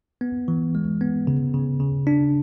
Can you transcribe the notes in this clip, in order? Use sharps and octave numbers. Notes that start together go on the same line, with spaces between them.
B3
E3
G#3
B3
C#3
C#3
C#3
D4